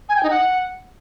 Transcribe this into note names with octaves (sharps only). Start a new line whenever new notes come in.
G#5
G5
D#4
F#5